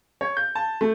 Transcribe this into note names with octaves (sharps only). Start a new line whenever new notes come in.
C#5
G6
A5
A3